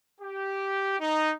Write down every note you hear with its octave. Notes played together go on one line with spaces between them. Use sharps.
G4
D#4